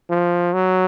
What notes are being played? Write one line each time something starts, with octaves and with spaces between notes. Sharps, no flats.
F3
F#3